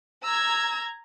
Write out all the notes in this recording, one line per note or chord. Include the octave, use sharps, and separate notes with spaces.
A#5 E6 G#6